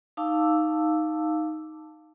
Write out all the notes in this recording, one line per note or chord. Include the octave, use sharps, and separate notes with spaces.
D#4 F5 A5 D6 E6